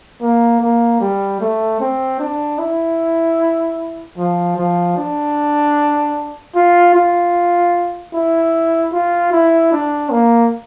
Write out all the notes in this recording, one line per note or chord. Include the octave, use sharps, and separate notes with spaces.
A#3
A#3
G3
A3
C4
D4
E4
F3
F3
D4
F4
F4
E4
F4
E4
D4
A#3